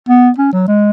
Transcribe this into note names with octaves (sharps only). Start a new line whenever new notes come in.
B3
C#4
F#3
G#3